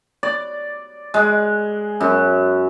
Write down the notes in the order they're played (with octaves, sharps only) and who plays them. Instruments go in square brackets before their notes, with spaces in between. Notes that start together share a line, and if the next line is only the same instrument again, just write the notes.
[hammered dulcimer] D5
G#3
F#2